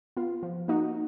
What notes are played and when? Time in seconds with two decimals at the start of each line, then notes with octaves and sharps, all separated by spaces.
0.17 B3 F4
0.43 F3
0.68 A#3 D#4 F#4